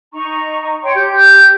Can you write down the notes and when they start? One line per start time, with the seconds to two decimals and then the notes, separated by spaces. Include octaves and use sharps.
0.13 D#4 D#5 A#5 C#6
0.83 C#5 G5 C6
0.95 G4 G6